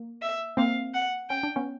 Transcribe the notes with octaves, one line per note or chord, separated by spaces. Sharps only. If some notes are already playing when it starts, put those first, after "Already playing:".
Already playing: A#3
E5
A#3 C4 F5
F#5
C#4 G5
D4
B3 C#4